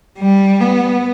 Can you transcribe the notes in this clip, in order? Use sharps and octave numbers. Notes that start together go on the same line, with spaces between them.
G3
B3